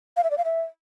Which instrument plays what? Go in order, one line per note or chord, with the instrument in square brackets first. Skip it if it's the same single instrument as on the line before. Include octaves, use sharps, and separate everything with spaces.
[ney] F5
E5
D5
F5
E5